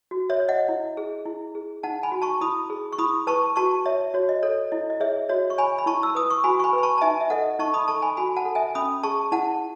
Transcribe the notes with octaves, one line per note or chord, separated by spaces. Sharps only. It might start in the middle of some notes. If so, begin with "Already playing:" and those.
F#4
C#5 E5
C#5
D#5 F#5
E4
G#4
E4
G#4
D#4 F#5 A5
G#5 B5
F#4
A5 C#6
E4 B5 D#6
G#4
C#6
E4 B5 D#6
B4 A5 C#6
F#4 A5 C#6
C#5 E5
F#4 C#5
D#5
A4 C#5
E4 D#5
D#5
G#4 C#5 E5
F#4 C#5 E5
C#6
C#5 G#5 B5
B5
E4 A5 C#6
E6
B4 D#6
C#6
F#4 G#5 B5
C#6
G#5 B5
B4
B5
A5 C#6
A5
D#4 E5 G#5
E5
A4 D#5 F#5
D#4 A5 C#6
B5 D#6
A4 A5 C#6
G#5 B5
F#4 G#5 B5
F#5 A5
A4
E5 G#5
C#4 B5 D#6
G#4 A5 C#6
E4 F#5 A5